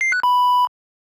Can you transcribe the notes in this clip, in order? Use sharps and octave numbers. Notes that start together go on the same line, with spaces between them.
C7
F#6
B5